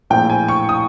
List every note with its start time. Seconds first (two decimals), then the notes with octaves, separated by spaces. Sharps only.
0.10 A#1 A2 F3 A#3 G5
0.30 G#5
0.48 C#6
0.69 D#6